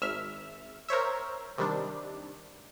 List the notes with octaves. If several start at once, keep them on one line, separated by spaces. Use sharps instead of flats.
G#1 E5 F6
A#4 C5 C#5 E5
C3 D#3 G3 D4